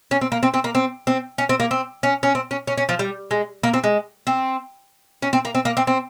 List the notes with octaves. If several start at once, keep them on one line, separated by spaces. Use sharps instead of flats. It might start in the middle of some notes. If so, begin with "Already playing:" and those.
C#4
C4
A#3
C4
C4
A#3
C4
C4
C#4
C4
A#3
C4
C#4
C#4
C4
C#4
C#4
C#4
F3
G3
G#3
A#3
C4
G#3
C4
C#4
C4
A#3
C4
A#3
C4
C4